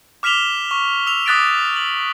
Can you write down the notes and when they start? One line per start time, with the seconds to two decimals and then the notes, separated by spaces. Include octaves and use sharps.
0.23 D6 F6 B6 E7 F7 G7
0.71 C#6
1.07 E6 F7
1.26 D6 D#6 F#6 A6 B6 D7
1.76 F#7